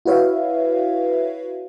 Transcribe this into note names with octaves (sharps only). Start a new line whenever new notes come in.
E4 F#4 B4 C#5 E5 F5